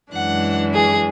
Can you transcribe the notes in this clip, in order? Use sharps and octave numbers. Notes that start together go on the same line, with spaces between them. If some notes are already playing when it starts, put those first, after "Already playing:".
F#2 E3 G#3 D4 F#5
G#4